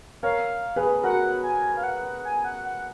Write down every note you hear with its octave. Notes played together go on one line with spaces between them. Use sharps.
A#4 C#5 F5
G#4 B4
F#4 A#4 F#5
G#5
F5
F#5
F#5
G#5
F#5
F#5